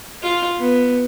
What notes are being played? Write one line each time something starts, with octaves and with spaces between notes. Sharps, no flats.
F4
B3